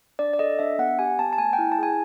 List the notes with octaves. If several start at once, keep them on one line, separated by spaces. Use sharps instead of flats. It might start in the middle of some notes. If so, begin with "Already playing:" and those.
D4 D5
D5
A4 D#5
D4 E5
B3 F#5
G4 G#5
B3 A5
A5
A3 G#5
G5
E4
A5
G#4 G#5